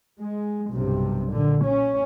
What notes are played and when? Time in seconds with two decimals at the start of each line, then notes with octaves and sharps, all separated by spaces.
0.22 G#3
0.71 B1 G2 C3
1.32 A#2 D3
1.66 C#4